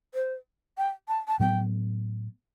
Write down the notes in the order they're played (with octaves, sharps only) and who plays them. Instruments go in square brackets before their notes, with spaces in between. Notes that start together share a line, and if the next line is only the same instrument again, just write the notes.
[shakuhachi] C5
G5
A5
A5
[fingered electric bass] A2 F#3 B3 [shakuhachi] G5